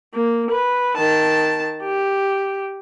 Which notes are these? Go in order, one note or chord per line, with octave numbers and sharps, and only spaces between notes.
A#3
B4
D#3 A5
G4